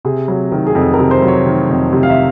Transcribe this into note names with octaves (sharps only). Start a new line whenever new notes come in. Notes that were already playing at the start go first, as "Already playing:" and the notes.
C3 G#4
F#3
D#3
G#4
F2 A4
A#4
C3
C5
F#3
C#5
D#3
F2
C3
F5
E5